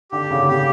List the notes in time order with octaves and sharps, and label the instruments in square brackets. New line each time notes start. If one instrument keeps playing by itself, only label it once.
[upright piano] D3 [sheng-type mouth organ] G4
[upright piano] C#3
[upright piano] C#3 [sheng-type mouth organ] G4